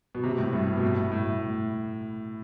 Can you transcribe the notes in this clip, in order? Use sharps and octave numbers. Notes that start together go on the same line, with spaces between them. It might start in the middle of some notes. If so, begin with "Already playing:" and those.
B2
C3
A2
G2
B2
A2
A2